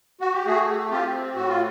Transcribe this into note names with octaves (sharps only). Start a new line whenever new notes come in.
F#4
G4
A3 F#4 G#4
C4 F4 G4
A2 F#4
F4